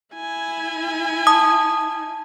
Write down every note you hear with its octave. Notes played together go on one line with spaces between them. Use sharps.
E4 G#5
A5 D#6